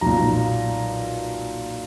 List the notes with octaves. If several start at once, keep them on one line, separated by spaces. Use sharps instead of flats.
B1 A#2 A#5